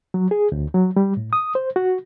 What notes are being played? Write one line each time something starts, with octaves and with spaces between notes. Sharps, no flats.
F#3
G#4
D2
F#3
G3
A2
D#6
C5
F#4